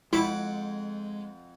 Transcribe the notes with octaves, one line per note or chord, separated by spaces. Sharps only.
F2 G#3 E4 F#5 D6